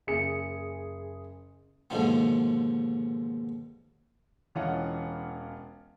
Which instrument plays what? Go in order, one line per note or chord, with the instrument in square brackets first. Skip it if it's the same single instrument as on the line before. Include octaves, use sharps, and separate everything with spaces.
[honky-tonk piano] F#1 G#4 C#7
[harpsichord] D#2 G#2 B2 D3 F3 B3
[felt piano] E1 E3 C#4 F4 D#5 F#5